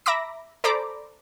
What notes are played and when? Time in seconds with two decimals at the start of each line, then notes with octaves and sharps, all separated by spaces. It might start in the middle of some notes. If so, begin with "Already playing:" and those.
0.06 E5 A#5 B5 D6 A#6
0.64 A4 C5 D5 A#5 B5 D6